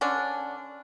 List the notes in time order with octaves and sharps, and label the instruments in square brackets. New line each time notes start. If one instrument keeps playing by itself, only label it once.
[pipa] D3 C#4 D4